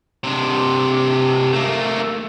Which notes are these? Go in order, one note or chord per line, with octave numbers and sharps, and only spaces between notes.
C3 D4
A3 A#3